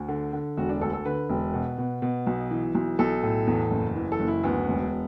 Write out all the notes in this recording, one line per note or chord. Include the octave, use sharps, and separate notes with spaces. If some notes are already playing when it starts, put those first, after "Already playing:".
Already playing: D2
D3
D3
E1 F#4
D4
D2 A4
A4
D3 B4
E1
B2
B2
B2
B1
E3
B1
B1 A4
A2
E2
F#1
E3
A4
F#1
E4
D2 B3
E1